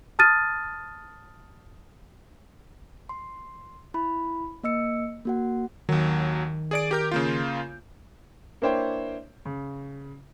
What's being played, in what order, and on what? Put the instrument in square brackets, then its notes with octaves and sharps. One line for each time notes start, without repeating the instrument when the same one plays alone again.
[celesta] A5 D#6 F6 A6 D#7
[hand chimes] C6
E4 B5
A#3 D#5 E6 C#7
A#3 F#4 F#5
[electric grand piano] D#2 F#3 [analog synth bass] D#3
[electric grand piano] G#4 D5 D7
G4 A#4 G6
C#3 A#3 F4
[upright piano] A#3 D4 E4 C5 C#5 G5
C#3